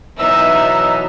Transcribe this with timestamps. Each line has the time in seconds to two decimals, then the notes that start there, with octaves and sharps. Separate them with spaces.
0.19 B2 E3 F#3 B3 D#4 E5 E6